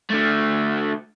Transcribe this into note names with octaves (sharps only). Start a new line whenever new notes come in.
D3 A3